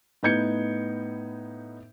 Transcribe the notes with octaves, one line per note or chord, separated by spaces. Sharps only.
A2 B3 D#4 G6 G#6 C#7